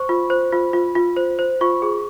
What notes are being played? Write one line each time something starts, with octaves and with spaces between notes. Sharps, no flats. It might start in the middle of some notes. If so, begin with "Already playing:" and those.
Already playing: C5 C#6
F4
C5
F4
F4
F4
C5
C5
F4 C#6
G#4